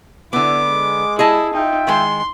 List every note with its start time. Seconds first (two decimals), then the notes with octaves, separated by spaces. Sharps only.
0.33 D3 B3 E4 D6
0.67 G#3
1.19 E4 G#4 D#5 A5
1.53 D#4 F4 E5 G5
1.87 D#3 G#3 C6